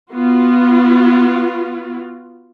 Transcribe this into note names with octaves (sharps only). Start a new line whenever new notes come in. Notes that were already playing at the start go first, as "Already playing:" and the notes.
B3 F4 F#4